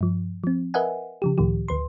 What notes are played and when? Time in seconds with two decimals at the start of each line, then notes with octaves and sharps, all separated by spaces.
0.01 G2 F3
0.44 F3 C4
0.74 A#4 B4 D#5 E5 F#5 G#5
1.22 C#3 F3 G4
1.38 C#2 A2 D#3 F3 G4
1.68 D2 B4 C6